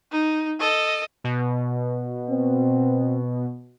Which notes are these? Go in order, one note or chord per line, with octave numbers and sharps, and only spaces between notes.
D#4
A4 D#5
B2
C4